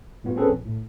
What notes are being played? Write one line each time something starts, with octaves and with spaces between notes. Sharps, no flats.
A2 G3 B3 F4 F#4
C4 C#4 G#4 A4 B4
A#1
A2